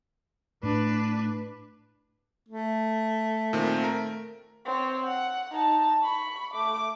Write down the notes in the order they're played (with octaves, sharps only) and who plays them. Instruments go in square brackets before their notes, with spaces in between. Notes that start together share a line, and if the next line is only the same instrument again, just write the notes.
[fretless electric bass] A2 [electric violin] D4 B4
[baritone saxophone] A3
[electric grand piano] A#2 D#3 C4
A#4
[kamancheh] C4 C#5
F#5
D#4 A5
B5 C#6
A3 D6